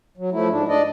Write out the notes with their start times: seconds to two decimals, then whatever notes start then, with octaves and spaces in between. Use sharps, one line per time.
0.17 F#3
0.32 F3 A3 E4
0.49 G#2 D4
0.68 D4 D5 D#5